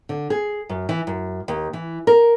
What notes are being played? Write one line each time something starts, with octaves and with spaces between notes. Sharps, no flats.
D3
G#4
F#2
E3
F#2
D#2
E3
A#4